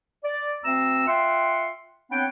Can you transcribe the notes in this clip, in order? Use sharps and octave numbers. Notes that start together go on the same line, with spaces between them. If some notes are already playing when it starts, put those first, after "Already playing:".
D5
D2 C4 A#5 E6
F4 E5 F#5 G5 C6
B3 C4 D4 C#5 F#5 G5